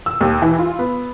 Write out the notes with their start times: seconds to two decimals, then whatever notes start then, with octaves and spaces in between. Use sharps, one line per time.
0.06 E6
0.21 D#2
0.42 E3
0.59 F4
0.79 B3